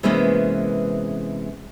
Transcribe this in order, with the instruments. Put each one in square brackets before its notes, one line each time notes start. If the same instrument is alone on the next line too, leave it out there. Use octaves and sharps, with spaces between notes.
[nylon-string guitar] C3 E3 G#3 A#3 B3 C#4